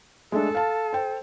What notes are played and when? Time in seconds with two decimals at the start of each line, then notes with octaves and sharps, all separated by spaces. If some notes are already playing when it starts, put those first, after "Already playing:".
0.32 G#3 A3 D4 A4
0.55 F5 A5
0.93 C5 G5